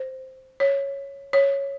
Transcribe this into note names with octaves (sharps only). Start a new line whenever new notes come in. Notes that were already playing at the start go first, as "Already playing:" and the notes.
Already playing: C5
C#5
C#5